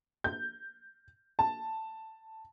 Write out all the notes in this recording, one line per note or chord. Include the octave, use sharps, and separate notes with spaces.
G6
A5